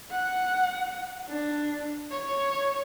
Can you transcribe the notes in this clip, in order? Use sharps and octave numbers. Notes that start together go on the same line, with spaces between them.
F#5
D4
C#5